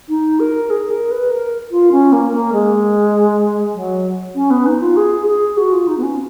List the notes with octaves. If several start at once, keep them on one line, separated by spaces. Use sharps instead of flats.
D#4
A#4
G#4
A#4
B4
A#4
F4
C#4
A#3
A#3
G#3
F#3
C#4
B3
D#4
F4
G#4
G#4
F#4
F4
D#4
B3
C#4